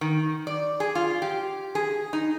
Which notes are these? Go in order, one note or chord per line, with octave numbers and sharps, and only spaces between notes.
D#3
D5
G#4
F4
G4
G#4
D#4